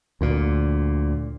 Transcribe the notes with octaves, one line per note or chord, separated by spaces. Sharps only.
D2 A#2